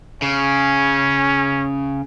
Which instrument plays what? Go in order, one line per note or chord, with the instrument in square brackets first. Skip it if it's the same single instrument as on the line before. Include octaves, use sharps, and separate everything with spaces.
[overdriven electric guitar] C#3 [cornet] C#4